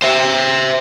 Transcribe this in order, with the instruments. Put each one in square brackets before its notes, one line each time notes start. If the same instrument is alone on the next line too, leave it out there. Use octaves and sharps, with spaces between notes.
[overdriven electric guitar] C5 E5